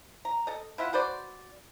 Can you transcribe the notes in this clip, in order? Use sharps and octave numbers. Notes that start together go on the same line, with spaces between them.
A#5
A4 D#5
E4 F4 E5 F#5
F#4 B4 C5 D5